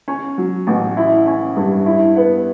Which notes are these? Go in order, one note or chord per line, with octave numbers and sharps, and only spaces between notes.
C#4
F#3
A1
E4
C#4
G2
E4
B3